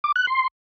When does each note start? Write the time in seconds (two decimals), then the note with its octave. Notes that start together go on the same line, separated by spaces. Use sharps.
0.04 D6
0.16 F#6
0.27 C6